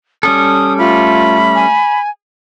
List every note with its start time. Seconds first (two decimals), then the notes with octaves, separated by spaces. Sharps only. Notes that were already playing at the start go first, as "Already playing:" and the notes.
0.23 G3 C#4 A4 D#6
0.78 A3 F4 B5
1.55 G#5